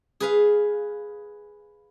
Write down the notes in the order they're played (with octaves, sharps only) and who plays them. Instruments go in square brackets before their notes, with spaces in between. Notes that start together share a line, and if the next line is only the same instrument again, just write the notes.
[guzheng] G#4 B4 F5